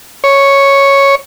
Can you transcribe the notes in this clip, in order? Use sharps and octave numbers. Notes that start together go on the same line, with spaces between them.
C#5